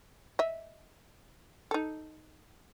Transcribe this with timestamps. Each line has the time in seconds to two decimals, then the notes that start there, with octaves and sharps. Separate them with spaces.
0.39 D#5 E5
1.71 D#4 A4